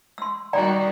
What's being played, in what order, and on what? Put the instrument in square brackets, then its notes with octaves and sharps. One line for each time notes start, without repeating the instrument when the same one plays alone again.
[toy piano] C6 E6
[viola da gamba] D#3 G3 F#4 [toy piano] D5 G5 A#5